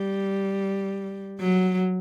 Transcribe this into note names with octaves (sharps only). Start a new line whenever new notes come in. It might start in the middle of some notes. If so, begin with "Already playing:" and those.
Already playing: G3
F#3